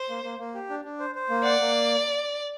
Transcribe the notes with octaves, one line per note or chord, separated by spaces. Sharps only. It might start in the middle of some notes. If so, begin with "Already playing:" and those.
Already playing: C5
A#3
A#3
A#3
G4
D4
D4
C5
C5
A#3
D5 F#5
A#3